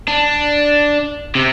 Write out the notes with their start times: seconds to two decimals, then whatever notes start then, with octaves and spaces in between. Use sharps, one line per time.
0.08 D4
1.35 C3